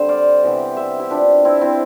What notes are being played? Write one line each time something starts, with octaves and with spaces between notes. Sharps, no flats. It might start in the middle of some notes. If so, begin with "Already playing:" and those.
Already playing: D3 G3 C4 C5
D5 F5
C3 E3 B3
C5 E5
E4 G4
D4 F4
C4 E4
C4 E4